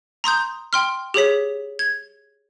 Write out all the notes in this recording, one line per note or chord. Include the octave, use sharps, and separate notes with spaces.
A#5 C6 D#6 G6
G5 C6 F6
G4 G#4 C#5 B6
G#6